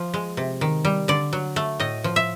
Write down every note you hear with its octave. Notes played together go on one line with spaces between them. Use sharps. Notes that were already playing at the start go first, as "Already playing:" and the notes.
Already playing: F3
G#3
C3
D#3
G3
D3 D5
F#3
A3
A2 D#5
F3
E5